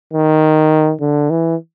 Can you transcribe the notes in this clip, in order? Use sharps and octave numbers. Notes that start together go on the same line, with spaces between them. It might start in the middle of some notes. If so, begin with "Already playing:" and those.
D#3
D3
E3